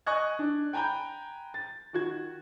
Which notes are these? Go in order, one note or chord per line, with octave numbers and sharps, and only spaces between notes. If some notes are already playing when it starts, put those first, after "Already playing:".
D#5 G#5 C#6 D#6 F#6 G#6
D4
G5 G#5 A#5 B5 G6
A6
D#3 F#4 G#6